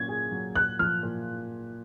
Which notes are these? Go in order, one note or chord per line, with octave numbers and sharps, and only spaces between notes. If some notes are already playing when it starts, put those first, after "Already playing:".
Already playing: A#2 F#3 C#4 G#6
G#4
F#3
A#2 F#6
F3 F6
A#2